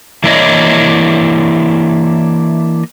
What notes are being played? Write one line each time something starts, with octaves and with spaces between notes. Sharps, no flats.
E3 A#3 D4 E4 C#5 D#5